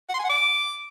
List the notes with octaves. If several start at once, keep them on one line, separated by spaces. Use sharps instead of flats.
F#5
C6
G#5
F#5
D6